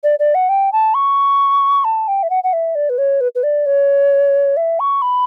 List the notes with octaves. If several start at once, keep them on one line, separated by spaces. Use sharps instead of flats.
D5
D5
F#5
G5
A5
C#6
A5
G5
E5
F#5
F#5
E5
D5
B4
C#5
B4
B4
D5
C#5
E5
C#6
B5